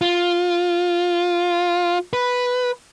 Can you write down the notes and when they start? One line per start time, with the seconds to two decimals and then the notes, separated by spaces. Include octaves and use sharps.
0.01 F4
2.13 B4